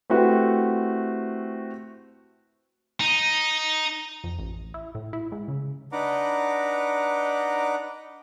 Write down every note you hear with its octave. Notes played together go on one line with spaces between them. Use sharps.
A3 C4 E4 F#4 G4 B4
D#4
F2
A1
E4
A2
E4
G#2
C#3
D4 D#4 B4 F#5 A#5 D6